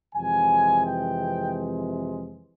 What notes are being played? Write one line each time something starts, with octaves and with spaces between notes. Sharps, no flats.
F2 C3 E3 G#3 G#5
G5